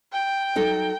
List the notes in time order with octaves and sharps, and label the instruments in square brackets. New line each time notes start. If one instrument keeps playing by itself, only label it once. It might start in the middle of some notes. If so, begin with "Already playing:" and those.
[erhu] G5
[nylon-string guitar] F#3 D#4 A4